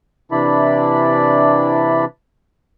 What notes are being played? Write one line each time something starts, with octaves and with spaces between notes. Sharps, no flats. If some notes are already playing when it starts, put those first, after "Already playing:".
C3 E3 D4 E4 D5 B5